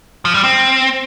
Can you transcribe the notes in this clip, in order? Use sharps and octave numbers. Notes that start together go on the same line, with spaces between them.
F3
G3
C4